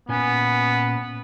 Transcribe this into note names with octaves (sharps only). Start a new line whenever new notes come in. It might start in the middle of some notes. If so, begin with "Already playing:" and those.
A#2 B3 C#4 G#5